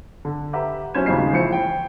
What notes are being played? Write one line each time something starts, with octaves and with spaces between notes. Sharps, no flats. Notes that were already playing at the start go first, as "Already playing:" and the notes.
D3
G4 B4 E5 F#5 A#5
B1 C#4 E4 C5 G#6 E7
D#1 G#1 C#3 G#3 D#4 C7
A#1 E3 C5 C#7
G5